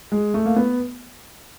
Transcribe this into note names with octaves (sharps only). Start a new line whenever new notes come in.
G#3
A3
A#3
B3